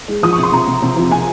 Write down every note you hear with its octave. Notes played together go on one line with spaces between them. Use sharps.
G#3
F3 D#6
C#6
C3
C6
C3 A#5
C3
C3
F3
C3 G#5